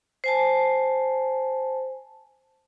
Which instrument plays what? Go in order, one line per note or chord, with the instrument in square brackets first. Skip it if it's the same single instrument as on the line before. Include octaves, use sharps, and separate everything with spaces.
[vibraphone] C5 G#5 A5